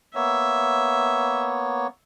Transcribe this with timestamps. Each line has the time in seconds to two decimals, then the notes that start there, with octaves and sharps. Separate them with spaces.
0.15 A#3 B3 C#5 E5